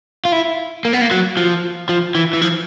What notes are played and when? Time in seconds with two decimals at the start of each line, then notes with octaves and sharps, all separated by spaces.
0.25 F4
0.32 E4
0.85 A#3
0.93 B3
1.01 A#3
1.11 F#3
1.37 F3
1.89 F3
2.15 E3
2.33 E3
2.42 F3